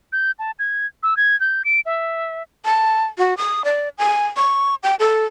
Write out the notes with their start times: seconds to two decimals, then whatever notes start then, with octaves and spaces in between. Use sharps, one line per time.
0.13 G6
0.39 A5
0.59 G#6
1.03 E6
1.17 G#6
1.40 G6
1.65 D7
1.86 E5
2.65 A5
3.18 F#4
3.38 D#6
3.65 D5
3.98 G#5
4.37 C#6
4.83 G5
5.00 A4